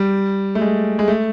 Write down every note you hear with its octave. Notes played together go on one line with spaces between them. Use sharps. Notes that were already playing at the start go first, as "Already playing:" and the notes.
Already playing: G3
A3
G#3
G#3
A3